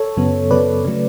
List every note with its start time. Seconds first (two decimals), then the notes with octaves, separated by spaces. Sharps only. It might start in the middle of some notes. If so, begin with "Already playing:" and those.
Already playing: A4 C#5
0.17 F#2 C#3 F#3 B3
0.50 F#2 C#3 F#3 B3 B4 D5
0.85 C#3 F#3 A3